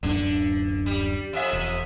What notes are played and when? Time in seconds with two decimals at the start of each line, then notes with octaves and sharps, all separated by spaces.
0.03 D1 F#2 D3 D4
0.86 G3
1.33 F2 E5
1.53 E1